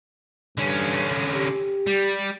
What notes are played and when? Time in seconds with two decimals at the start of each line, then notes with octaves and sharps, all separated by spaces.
0.58 G2 D3 C#4
1.34 G4
1.87 G3